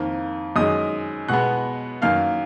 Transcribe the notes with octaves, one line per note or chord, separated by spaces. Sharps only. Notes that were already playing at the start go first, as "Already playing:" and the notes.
Already playing: F2 D#3 A#3
F#2 D#3 G#3 D#5 D#6
B2 G#3 B3 F#5 F#6
F#2 D#3 A#3 F5 F6